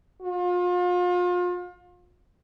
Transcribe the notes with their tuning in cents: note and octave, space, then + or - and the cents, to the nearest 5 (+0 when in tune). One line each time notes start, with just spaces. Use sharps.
F4 +35